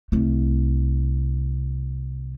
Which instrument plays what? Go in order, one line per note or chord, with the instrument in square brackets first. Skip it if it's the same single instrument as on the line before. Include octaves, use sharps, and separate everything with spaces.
[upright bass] C2 A3